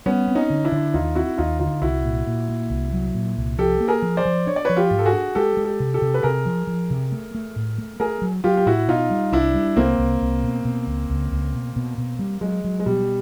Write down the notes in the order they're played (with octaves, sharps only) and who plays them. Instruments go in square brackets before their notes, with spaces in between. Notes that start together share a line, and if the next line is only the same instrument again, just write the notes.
[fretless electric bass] G3 [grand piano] B3 C#4
[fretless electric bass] C4
[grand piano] C#4 D#4
[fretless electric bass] D3
[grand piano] D4 E4
[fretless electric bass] D3
[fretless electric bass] D#2 [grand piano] D#4 F4
[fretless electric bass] C4 [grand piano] E4 F#4
[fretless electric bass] D#2 [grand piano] D#4 F4
[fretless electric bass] D3 [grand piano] D#4 F4
[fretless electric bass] C2 [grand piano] E4 F#4
[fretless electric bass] A#2
A#2
A#3
C2
F#3
A#2
C2
[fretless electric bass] F3 [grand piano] G4 A4
[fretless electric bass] A#3
[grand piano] G#4 A#4
[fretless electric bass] F3
[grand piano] C5 D5
[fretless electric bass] F3
[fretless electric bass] D4 [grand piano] C#5
[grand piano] D5
[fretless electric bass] F3 [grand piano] B4 C#5
[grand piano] F4 G4
[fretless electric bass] G#2
[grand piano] A4
F#4 G#4
[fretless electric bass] D4
[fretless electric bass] G#3 [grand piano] G4 A4
[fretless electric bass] G#3
[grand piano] G4 A4
[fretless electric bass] C3
[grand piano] G4 A4
[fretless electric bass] C3
[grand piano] B4
[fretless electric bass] C3 [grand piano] G#4 A#4
[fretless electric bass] F3
F3
C3
A3
A3
A2
A3
[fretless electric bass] A3 [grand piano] G#4 A#4
[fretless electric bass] F#3
[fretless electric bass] F#3 [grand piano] F4 G4
[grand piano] G4
[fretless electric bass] A2 [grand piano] E4 F#4
[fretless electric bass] B2 [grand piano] D#4 F4
[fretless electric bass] G3
[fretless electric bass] C2 [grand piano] D4 E4
[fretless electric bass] G3
[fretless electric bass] C2 [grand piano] A#3 C4
[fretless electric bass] C2
C2
B2
B2
C#2
C#2
C#2
B2
B2
B2
G3
[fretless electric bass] F#3 [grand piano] G#3
[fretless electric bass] F#3
[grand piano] G#3
[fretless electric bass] B2 [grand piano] G3